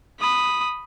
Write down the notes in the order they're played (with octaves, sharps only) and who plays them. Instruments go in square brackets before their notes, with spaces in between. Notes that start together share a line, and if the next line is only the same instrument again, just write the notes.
[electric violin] B5 D#6